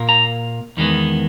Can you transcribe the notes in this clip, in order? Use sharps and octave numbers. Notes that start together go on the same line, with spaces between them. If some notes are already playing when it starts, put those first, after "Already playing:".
Already playing: A#2 A#3
A#5
E2 D#3 G#3 B3